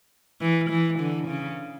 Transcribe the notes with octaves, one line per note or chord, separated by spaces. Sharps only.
E3
E3
D3
C#3